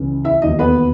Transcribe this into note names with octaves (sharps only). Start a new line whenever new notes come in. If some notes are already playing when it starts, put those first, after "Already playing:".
Already playing: C#2 C#3 E3
E4 E5
E1 D#2 D#3 D#4 D#5
B3 B4